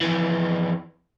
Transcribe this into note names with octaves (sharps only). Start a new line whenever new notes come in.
F2 E3